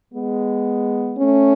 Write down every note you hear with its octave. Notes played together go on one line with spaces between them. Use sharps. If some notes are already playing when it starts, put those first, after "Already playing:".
G#3 B3
A3 C#4